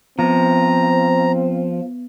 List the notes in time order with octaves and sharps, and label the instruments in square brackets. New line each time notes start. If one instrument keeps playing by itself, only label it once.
[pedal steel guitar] F3 [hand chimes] B3 [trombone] C4 [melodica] A#5